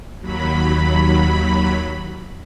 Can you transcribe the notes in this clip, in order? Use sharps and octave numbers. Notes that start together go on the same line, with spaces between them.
D#2 F#3 B5